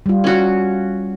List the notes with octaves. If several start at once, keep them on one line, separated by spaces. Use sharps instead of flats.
G3 F4
C#4 F#4